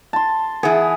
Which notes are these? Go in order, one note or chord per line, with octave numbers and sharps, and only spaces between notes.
A5 C6
E3 B3 G#4